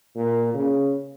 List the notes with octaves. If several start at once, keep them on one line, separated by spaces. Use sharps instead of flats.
A#2
C#3